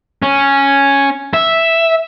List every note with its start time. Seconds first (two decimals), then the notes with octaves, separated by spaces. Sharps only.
0.22 C#4
1.34 E5